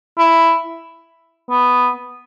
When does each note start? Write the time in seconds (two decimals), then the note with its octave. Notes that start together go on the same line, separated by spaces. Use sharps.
0.18 E4
1.50 B3